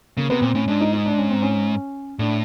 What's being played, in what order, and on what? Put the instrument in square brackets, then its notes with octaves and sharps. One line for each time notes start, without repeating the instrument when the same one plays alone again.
[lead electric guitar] C#3 [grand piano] A#3
[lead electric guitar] C3 [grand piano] B3
[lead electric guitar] A#2 [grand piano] C4
[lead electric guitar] A2 [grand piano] C#4
[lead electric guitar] G#2 [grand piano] D4
[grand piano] D#4
D#4
D4
C#4
C4
C#4
[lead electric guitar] A2 [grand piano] D4